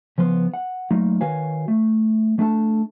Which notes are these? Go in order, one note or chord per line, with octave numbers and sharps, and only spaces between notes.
C#3 F3 B3 C6
F#5
F#3 A3 A#3 D#4 F4
D#3 F#4 B4 C#5 F5 G#5
A3
A3 D4 A4 A5